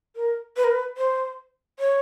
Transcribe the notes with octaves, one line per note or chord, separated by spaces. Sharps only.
A#4
B4
A#4
B4
C5
C#5